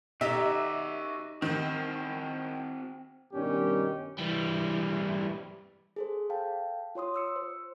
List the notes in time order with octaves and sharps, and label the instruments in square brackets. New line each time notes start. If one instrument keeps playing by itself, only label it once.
[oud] D#4 G4 [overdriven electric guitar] F#4 D5 [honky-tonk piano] E5
[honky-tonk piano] D#3 [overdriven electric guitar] C4 F#4
[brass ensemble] G2 B2 D#3 G3 C#4 G4
[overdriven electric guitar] E3 G3
[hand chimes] G#4 A4 C5
A4 F5 G5 A5
F4 C#5 C6 D#6
D#6 E6 C#7
C5